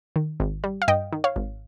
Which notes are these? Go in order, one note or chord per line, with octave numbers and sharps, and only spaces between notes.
D#3
G#1
G3
F5
G2 D#5 G5
D#3
C#5 F5
G#1